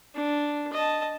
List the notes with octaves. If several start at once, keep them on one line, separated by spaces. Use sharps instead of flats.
D4
D#5 A5